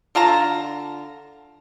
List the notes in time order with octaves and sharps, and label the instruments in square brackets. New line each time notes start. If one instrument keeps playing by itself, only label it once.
[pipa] D3 F4 A5 A#5